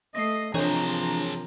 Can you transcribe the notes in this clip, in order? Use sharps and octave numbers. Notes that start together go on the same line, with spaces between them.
A3 D#5 A#6 C7
C3 E3 F3 D4 G#4 A#4 C#5 A#5